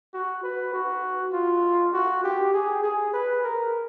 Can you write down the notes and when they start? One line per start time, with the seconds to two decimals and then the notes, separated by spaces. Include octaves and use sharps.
0.14 F#4
0.44 B4
0.73 F#4
1.33 F4
1.93 F#4
2.24 G4
2.53 G#4
2.83 G#4
3.13 B4
3.44 A#4